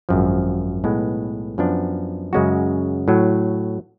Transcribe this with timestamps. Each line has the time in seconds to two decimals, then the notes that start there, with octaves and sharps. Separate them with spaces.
0.09 G#1 F#2 F3
0.84 B1 A2 G#3 B3
1.58 F#2 F3 B3 D4
2.33 F#2 C#3 G#3 C#4 F#4
3.08 A2 F#3